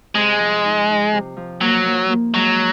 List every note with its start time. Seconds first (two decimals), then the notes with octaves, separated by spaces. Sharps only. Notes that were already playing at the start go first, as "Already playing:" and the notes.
0.15 C3 G#3
0.39 F3
0.64 D#4
0.88 D#4
1.13 C3
1.37 F3
1.61 F#3 A#3
1.85 A#3
2.09 A#3
2.34 G#2 F#3